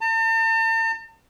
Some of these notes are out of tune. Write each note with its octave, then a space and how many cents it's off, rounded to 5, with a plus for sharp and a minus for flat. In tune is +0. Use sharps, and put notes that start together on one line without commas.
A5 +45